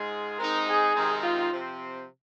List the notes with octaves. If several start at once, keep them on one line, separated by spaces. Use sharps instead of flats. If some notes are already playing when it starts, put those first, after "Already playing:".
Already playing: G#2 G#3 F4 G#4
G#3 C4 D#4 A#4
G#4
C3 D#3 G#3 C4 D#4
F4
C3 F3 C4